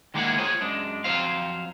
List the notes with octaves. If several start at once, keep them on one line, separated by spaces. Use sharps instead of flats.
D#3 G#3 A#3 E4 G#4 F#5
F4 G#4 C5 C#5 G#5
F#2 G#3 D4
F2 F#3 C4 C5 F5